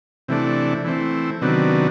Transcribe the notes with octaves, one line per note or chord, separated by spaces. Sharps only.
C3 E3 A3 D4
E3 A3 C4
C3 D#3 F#3 B3 D4